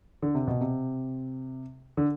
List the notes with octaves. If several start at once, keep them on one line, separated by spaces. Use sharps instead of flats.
D3
C3
B2
C3
D3